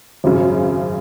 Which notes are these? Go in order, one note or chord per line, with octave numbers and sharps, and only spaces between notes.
G#1 F#2 C#3